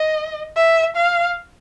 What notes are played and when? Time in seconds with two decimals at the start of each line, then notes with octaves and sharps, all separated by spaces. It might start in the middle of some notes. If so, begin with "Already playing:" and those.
Already playing: D#5
0.56 E5
0.96 F5